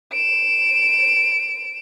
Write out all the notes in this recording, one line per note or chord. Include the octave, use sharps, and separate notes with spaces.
D7 E7